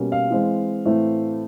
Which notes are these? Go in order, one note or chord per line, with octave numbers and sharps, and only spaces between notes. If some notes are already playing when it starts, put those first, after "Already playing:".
Already playing: B2 G3 A#3 C#4
F5
E3 G#3 C4
A2 E3 A3 C4